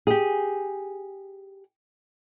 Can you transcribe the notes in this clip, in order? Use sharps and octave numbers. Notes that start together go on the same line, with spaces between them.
G4 G#4